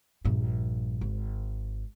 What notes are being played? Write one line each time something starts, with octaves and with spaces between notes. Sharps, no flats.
A#1 G2
G#1